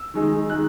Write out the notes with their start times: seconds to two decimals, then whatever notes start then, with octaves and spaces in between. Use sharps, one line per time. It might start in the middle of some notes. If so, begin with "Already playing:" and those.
Already playing: E6
0.14 D#3 G#3 D#4
0.50 D#3 G#3 D#4 F#6